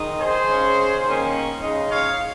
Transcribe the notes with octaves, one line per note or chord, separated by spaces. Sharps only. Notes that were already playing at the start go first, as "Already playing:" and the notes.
Already playing: D#3 G#3 D#4
G#4 C5
C#3 G#3 C#4
D#3 A#3 C#4
C#3 G#3 D#4
C#5 F5